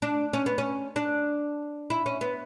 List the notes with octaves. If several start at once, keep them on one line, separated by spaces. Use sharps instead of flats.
D4
C#4
B3
C#4
D4
E4
C#4
B3